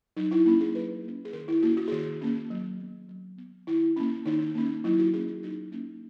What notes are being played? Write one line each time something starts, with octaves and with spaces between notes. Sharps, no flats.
F#3 D#4
E4
A#3 C#4
G#4
F#3 B4
A#3 C#4
G#4
D#3 A#4
E4
A#3 C#4 F#4
F#4
G#4
D#3 F#4
A#3 C#4
F#3
B3
F#3
B3
D#3 E4
A#3 C#4
D#3 D#4
A#3 C#4
F#3 E4
F#4
A#3 C#4 G#4
F#4
F#3 D#4
A#3 C#4